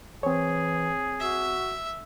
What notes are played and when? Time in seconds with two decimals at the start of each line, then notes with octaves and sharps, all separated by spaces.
0.23 E3 C4 G#4 C#5
1.20 F#4 E5